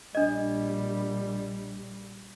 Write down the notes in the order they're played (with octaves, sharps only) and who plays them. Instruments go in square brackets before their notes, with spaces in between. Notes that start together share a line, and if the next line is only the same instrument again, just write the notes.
[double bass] A#1 G3 [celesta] D4 D#5